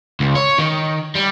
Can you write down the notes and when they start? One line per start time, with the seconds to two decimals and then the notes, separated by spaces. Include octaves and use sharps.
0.20 C#2
0.35 C#5
0.58 D#3
1.15 G3